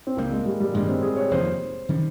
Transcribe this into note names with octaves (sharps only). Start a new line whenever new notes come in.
C4
C#2 C#3 G3 A#3 C4
G#3
G3
G3
G2 D#3 G#3 A#3
C4
G#4
C#5
F1 F2 D#3 A#3 C5
D#3 G3 C#4